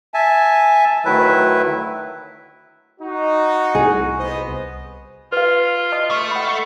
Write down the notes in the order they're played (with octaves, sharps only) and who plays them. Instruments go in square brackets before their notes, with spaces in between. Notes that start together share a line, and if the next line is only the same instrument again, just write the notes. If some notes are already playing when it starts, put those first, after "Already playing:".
[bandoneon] E5 G#5 A5
D2 D#3 F#3 E4 B4 E5
[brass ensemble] D#4 [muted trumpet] F#4
[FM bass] C2 [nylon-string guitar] G#4
[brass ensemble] B3 C5 D#5
[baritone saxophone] F4 [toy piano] B4 F5
[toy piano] D#5 A5 D#6
[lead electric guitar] A3
[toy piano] F#5 B5